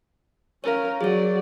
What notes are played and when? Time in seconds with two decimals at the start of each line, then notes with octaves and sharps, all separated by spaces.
0.64 C#4 A#4 C#5 F5
1.01 F#3 G#4 C#5 D5